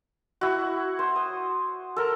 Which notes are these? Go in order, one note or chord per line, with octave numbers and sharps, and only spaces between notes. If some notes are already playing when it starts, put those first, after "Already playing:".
E4 F#4
C5
D#6
A4 A#4